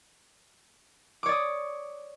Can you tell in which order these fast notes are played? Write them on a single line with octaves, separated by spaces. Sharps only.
D6 C#5 D5 D#6